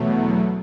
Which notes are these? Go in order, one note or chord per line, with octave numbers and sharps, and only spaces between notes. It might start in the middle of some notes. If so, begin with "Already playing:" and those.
Already playing: E2 B2 F#3 A3